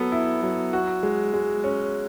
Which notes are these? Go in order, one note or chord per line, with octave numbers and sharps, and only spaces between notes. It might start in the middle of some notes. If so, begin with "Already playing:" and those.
Already playing: F#3 B3 A4
E4
F#3
F#4
G#3
G#3
C#4